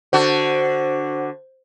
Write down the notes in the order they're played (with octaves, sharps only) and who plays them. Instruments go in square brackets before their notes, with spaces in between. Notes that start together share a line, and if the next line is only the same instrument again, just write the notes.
[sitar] D3 F#4 [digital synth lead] C5